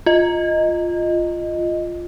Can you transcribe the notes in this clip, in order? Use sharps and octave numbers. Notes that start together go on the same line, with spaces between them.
F4 D#5